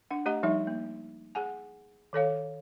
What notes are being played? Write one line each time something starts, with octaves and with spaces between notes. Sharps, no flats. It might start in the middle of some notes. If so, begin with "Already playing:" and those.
D4 F#5
A3 G4 D#5 F#5 A#5
F3 G3 D#4 E5
A#3
G#4 F#5 G#5
D#3 A4 C#5 F5